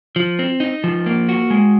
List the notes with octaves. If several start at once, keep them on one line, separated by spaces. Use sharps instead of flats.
F3
C4
D#4
F3
A#3
F#4
G#3